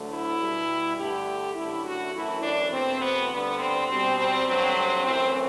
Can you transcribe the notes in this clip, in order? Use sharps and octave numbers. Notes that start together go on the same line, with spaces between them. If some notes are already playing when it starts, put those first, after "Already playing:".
Already playing: D2 D3 F#3 A3
E4
B2 G3
G2 D3 A3 G4
F#2 D3 A3 E4
F#4
F#2 E3 A3 E4
D4
E2 B2 A3 C4
B3
D2 D3 G3 B3
C4
B2 G3 C4
C4
G2 F#3 A3 C4
C4
F#2 E3 A3 C4